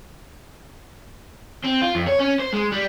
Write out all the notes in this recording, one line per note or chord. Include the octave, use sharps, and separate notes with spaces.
C4
F4
F2
C#5
C#4
C5
G#3
G3